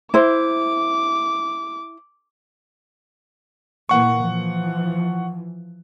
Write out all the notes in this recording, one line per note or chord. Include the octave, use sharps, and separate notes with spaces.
E4 C5 D6
A#2 E3 A#3 F#5 C#6
E3 F3